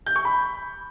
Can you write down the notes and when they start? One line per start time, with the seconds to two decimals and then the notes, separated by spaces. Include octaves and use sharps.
0.06 G6
0.16 C#6
0.25 B5